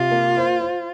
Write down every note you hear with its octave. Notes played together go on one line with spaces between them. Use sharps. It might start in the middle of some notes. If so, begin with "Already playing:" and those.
Already playing: C3 F4
A#3
C5
C5